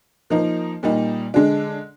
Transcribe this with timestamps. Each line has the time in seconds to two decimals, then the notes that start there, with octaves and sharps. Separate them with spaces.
0.30 F3 A#3 D#4 A#4
0.83 A#2 G3 A#3 D#4
1.34 D3 G#3 D4